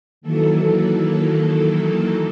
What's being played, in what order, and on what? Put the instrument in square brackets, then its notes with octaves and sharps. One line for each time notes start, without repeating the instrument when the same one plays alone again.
[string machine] D#3 E3 F#3 A#3 A4